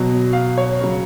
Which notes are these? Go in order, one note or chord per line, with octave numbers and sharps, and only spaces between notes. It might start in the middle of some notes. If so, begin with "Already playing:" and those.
Already playing: B2 F#3
F5
C#5
C#3 F#3